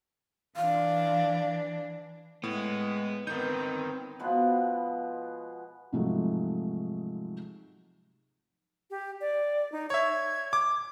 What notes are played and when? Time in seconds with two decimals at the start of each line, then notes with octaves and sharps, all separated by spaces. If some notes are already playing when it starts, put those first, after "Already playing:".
0.57 E3 D4 F5
2.43 A2 G#3 B3
3.27 G1 B3 C4 D#4 A#4 G6
4.20 B2 F3 G#3 B3
5.93 G#2 C3 F3 F#3 G#3 A3
8.90 G4
9.21 D5
9.72 D#4
9.90 C#5 E5 G#6
10.53 D6